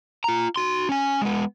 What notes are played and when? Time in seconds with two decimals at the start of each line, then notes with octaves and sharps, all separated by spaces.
0.24 F4 A#5
0.56 F#4 C6
0.89 C#4 G#5
1.22 G#3 B3